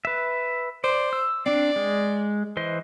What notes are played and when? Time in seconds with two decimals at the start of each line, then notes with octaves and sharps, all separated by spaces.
0.05 B4 E5
0.84 C5 D5
1.13 E6
1.46 C4 D4 D5
1.76 G#3
2.57 E3 C5 D#5